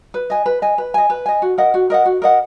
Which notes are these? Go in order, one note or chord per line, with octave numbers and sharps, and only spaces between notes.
B4
D#5 G#5
B4
D#5 G#5
B4
D#5 G#5
B4
D#5 G#5
F#4
A#4 D#5 F#5
F#4
A#4 D#5 F#5
F#4
A#4 D#5 F#5